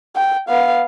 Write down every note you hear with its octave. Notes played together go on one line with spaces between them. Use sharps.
G5
B3 F5